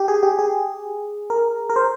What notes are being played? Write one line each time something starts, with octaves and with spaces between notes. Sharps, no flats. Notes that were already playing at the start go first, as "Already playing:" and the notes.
Already playing: G4
G#4
G4
G#4
A#4
A#4
C5